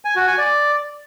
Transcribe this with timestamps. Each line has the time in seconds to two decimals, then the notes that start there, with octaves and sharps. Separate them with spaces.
0.05 G#5
0.16 F#4
0.27 G#5
0.38 D5